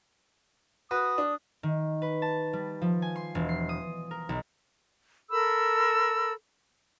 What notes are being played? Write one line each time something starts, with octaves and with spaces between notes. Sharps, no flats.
F#4 B4 D#6
D4
D#3
B4
A5
G3
F3
G#5
C6
E1
C7
D#6
A#4
B1
A4 A#4 B5 E6